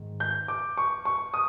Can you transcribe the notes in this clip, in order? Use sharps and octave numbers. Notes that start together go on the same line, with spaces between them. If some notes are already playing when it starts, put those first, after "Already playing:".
Already playing: G#2 D#3
G6
D6
C#6
C#6
D#6